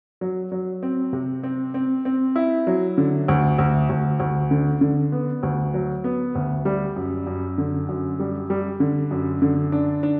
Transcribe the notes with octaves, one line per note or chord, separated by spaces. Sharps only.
F#3
F#3
C4
C3
C4
C4
C4
E4
F#3
D3
D2
D2
D2
D2
D3
D3
B3
D2
F#3
B3
D2
G3
F#2
F#2
D3
F#2
G3
G3
D3
F#2
D3
D4
D4